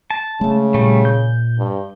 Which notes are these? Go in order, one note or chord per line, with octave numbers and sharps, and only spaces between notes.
A5
C#3 G#3 A3
A#2 G3 A3
G6
G2